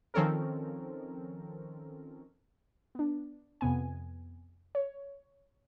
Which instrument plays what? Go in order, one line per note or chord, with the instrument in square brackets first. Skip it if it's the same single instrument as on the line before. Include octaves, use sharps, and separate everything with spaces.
[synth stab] D#3 F3 C4 C#4 A4 A#4
[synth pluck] B3 D4
F2 C3 B3 G#5
C#5